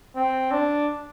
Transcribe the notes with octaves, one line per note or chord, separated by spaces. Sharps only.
C4
D4